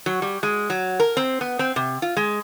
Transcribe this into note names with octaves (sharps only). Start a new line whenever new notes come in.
F#3
G3
G#3
F#3
A#4
C4
B3
C4
C3
F4
G#3